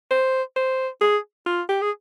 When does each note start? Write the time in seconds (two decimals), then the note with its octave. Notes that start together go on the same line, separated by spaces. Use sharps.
0.11 C5
0.56 C5
1.01 G#4
1.46 F4
1.69 G4
1.82 G#4